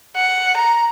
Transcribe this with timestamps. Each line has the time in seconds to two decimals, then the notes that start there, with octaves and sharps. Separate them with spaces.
0.16 F#5
0.56 A#5